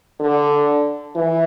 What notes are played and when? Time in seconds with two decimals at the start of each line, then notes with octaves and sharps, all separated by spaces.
0.20 D3
1.16 E3